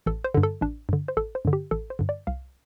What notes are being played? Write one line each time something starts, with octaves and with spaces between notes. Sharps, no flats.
A1 A4
C5
G2 D3
A4
A1 D4
G2 D3
C5
A1 A4
C5
G2 D3
G4
A1 A4
C5
G2 D3
D5
C2 F5